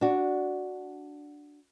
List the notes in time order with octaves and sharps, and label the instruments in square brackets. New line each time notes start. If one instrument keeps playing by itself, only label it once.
[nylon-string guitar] D4 F#4